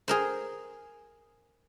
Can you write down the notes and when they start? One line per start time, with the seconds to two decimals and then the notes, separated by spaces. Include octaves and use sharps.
0.08 G#4 A#4 C5